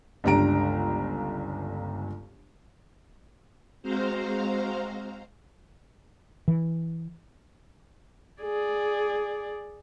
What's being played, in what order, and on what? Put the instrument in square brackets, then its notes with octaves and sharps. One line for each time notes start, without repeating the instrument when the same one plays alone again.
[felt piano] G1 C#2 D4 G4 A#5 D7
[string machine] G#3 C4 F#4 C5 F5 A#5
[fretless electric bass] E3
[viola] G#4 D5